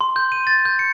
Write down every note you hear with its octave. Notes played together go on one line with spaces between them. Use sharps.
C6
G6
D#7
A6
G6
C#7